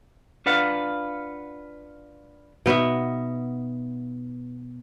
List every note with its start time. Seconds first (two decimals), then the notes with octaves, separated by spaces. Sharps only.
0.46 D4 F4 B4 F5 F#5
2.66 B2 B3 D#4 E5